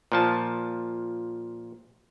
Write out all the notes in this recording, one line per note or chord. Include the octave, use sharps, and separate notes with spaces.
A#2 F3 A5